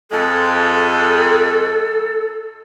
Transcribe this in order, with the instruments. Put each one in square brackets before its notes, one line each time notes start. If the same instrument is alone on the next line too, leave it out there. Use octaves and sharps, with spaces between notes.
[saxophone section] F2 G#3 [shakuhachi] A4